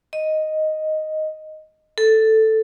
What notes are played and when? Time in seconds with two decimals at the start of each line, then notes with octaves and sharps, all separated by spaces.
0.13 D#5
1.98 A4